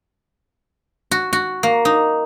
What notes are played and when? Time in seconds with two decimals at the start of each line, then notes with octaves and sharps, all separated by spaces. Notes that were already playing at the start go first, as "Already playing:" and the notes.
1.11 F#4
1.33 F#4
1.63 A#3
1.85 D#4